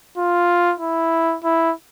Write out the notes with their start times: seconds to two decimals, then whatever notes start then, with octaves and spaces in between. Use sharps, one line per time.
0.17 F4
0.80 E4
1.44 E4